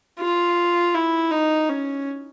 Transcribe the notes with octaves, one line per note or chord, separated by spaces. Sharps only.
F4
E4
D#4
C#4